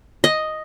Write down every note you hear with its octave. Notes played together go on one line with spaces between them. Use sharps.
D#5